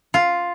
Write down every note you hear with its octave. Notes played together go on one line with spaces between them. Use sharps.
F4